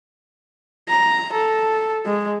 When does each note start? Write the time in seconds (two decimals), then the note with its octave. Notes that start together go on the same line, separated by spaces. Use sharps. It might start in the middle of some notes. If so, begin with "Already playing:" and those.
0.89 A#5
1.33 A4
2.05 G#3